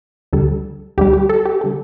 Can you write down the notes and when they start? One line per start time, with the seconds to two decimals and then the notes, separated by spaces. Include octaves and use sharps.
0.33 D2 D3 G3 A4
0.98 D2 D3 G3 G4
1.13 G4
1.29 A4
1.45 G4
1.61 D3 G3 A4